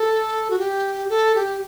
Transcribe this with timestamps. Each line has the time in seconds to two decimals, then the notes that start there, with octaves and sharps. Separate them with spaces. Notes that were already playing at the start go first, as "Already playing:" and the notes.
Already playing: A4
0.50 F#4
0.59 G4
1.10 A4
1.36 G4